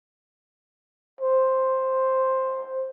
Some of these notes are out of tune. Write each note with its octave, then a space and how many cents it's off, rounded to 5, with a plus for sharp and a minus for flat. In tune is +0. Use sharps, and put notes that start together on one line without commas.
C5 +5